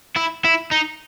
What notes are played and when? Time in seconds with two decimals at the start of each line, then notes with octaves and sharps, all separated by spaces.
0.16 E4
0.44 E4
0.72 D#4